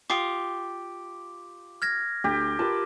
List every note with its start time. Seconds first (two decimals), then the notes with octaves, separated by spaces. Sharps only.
0.10 F4 G4 D6 D#6
1.82 F6 G#6 A#6
2.24 D2 G4
2.59 F4 G4 A#4 B4 A5